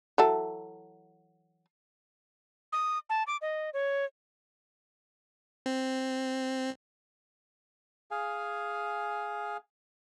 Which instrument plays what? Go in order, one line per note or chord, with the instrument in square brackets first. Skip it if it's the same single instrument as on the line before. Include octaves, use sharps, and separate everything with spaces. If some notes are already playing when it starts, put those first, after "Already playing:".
[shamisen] E3 F#3 A4
[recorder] D#6
A5
D6
D#5
C#5
[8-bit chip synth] C4
[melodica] G#4 F5 G#5